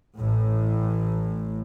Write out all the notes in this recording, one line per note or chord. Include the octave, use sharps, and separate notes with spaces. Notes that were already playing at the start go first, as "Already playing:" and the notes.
A1 A2